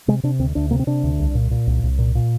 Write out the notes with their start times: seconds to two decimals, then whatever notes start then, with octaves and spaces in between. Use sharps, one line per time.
0.08 C3 G#3
0.23 C3 D4
0.39 D2 C4
0.55 D2 D4
0.71 C3 A#3
0.79 C4
0.87 C3 D4
1.03 D2
1.19 C2
1.35 A#2
1.51 A#2
1.67 C2
1.83 C2
1.98 A#2
2.15 A#2